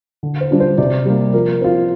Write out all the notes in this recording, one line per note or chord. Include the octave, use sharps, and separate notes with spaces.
D3
C5
G3 D4 F4
C5
C3 D5
G3 A#3
F3 A#4
C4 F4